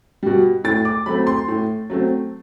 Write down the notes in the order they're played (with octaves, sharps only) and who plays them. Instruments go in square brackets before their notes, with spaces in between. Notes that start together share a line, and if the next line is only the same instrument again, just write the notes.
[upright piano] B2 G3
A2 A6
D6
F#3 A3 C4 B5
C6
A2
F#3 A3 C4